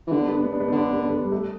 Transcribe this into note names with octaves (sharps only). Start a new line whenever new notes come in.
E3
D3 B3
D4
B3
D4
B3
D4
B3
D4
D3 B3
D4
B3
D4
B3
G3
A3